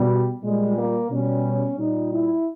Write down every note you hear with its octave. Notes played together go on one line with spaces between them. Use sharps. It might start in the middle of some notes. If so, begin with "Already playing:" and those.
Already playing: B2 G3
A#2 G3 G#3
A#3
B2 G3 C#4
A#2 G3 D#4
E4